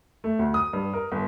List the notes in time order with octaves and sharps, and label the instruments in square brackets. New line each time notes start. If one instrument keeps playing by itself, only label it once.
[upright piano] A3
D2
D#6
G2
A#4
G1